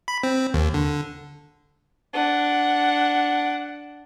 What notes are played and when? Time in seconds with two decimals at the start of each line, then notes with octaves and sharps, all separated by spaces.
0.08 B5
0.23 C4
0.54 D#2
0.74 D3
2.13 D4 F#5